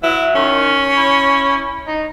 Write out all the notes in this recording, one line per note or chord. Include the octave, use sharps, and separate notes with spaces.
F#3 E4
D#3 C#4
E4
D#4